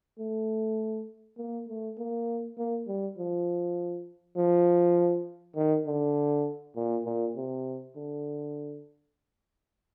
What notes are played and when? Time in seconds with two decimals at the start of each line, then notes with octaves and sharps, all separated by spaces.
0.19 A3
1.37 A#3
1.68 A3
1.98 A#3
2.58 A#3
2.87 G3
3.18 F3
4.36 F3
5.56 D#3
5.86 D3
6.76 A#2
7.05 A#2
7.36 C3
7.96 D3